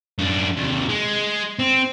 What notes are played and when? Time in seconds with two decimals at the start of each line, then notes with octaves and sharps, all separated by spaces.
0.19 F#2 D4
0.57 D#2 C3
0.89 G#3
1.59 C4